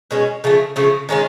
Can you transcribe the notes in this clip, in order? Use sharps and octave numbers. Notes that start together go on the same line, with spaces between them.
B2 G#3 C#4
C#3 F3 A3
C#3 F3 A3
D#3 G#3 C#4 F4